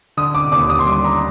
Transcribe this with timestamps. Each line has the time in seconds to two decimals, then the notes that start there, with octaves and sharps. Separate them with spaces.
0.17 D3 D#6
0.35 D6
0.52 D#2 D6
0.69 D#6
0.79 C6
0.87 G3 D6
1.04 A#5